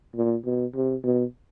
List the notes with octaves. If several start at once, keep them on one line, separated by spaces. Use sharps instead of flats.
A#2
B2
C3
B2